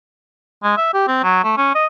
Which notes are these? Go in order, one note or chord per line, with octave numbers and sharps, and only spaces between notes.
G#3
E5
G4
C4
F#3
A3
C#4
D#5